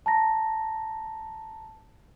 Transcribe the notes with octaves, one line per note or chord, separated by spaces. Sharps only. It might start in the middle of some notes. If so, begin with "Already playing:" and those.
A5 A#5 A#6